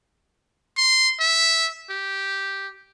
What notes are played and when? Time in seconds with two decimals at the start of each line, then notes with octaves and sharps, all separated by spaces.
0.77 C6
1.20 E5
1.90 G4